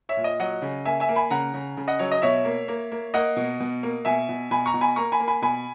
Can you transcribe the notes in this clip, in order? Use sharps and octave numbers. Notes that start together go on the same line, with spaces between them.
C#5 E5
A#2
D#5
F#3 D#5 F#5
C#3
A#3 E5 G#5
E5 G#5
A#3
G#5 B5
C#3 F#5 A#5
C#3
C#3
D#5 F#5
F#3 C#5
D#5
B2 C#5 E5
A#3
A#3
A#3
A#3 D#5 F#5
B2
B2
A#3
B2 E5 G#5
B2
B2 G#5 B5
A#5 C#6
B2
G#5 B5
A#3 A#5 C#6
G#5 B5
A#3
G#5 B5
B2 G#5 B5